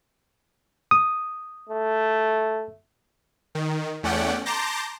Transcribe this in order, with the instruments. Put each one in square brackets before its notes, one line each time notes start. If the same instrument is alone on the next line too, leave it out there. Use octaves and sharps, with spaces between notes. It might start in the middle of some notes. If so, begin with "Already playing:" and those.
[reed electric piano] D#6
[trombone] A3
[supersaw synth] D#3
E2 A3 C#4 D5 F#5 G5
A5 A#5 C6 D6 G6 A#6